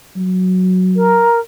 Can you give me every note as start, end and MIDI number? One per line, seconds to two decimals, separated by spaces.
0.16 1.26 54
0.96 1.39 70